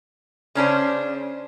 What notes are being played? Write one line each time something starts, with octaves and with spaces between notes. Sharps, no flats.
C#3 C#4 D4 C5